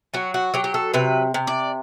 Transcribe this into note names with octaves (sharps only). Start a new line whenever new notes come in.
F#3 F#4
F#4
F#3 G4
G4
A4
C3 B4
C3
D5